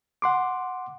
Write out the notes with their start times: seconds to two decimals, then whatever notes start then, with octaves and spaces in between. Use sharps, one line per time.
0.22 F#5 C6 D6